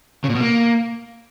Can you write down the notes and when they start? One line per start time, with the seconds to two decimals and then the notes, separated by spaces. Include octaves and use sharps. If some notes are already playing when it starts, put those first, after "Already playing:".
0.24 C#3
0.30 A#2
0.35 B2
0.41 A#3